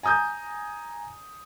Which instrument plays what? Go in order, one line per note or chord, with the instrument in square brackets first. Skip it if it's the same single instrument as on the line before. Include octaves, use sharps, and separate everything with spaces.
[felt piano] G#5 A#5 D#6 G6